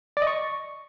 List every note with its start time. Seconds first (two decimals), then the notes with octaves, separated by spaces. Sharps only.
0.17 D5
0.22 D#5
0.27 C#6